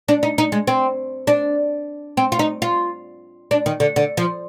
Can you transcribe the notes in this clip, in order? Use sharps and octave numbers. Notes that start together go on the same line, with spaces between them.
D4
D#4
D#4
G#3
C4
D4
C4
F4
D#4
F4
D4
D#3
D3
D3
F3